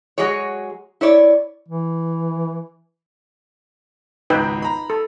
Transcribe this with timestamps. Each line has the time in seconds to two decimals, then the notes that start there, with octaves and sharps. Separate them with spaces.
0.18 F#3 G#3 F#4 G#4 C#5
1.01 E4 C#5 D5
1.68 E3
4.30 G#1 C#2 D#4 B4 G5
4.62 A#5 B5
4.90 A4